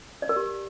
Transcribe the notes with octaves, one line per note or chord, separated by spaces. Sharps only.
D5
A#4
G4